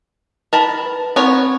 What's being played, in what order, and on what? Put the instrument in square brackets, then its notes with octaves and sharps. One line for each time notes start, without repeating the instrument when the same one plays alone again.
[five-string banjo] A#4 A5 B5
[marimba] B4
[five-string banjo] B3 A#4 C#5 [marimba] C4